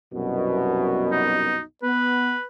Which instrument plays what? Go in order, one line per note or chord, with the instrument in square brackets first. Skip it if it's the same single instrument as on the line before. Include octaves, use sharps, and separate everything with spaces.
[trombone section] C2 F#2 B2
[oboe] D#4
[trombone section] B3 [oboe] B4